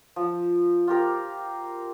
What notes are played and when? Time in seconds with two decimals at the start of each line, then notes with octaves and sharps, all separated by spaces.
0.16 F3
0.87 F4 G4 A#4